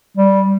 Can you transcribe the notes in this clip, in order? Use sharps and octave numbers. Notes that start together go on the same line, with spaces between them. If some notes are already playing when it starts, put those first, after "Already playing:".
G3